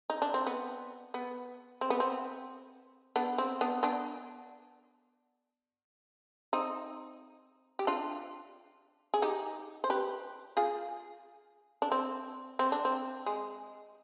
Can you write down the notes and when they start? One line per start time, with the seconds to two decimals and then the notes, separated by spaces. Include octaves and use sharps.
0.10 D#4
0.22 D4
0.34 C4
0.46 B3
1.14 B3
1.81 C4
1.90 B3
2.00 C4
3.16 B3 D4
3.38 C4
3.61 B3 D4
3.83 B3 D4
6.53 C4 D#4
7.79 G4
7.87 D4 F4
9.14 G#4
9.22 D#4 G4
9.84 C5
9.90 G4 B4
10.57 F4 G#4
11.82 D4
11.92 C4
12.59 C4
12.72 D4
12.85 C4
13.26 G#3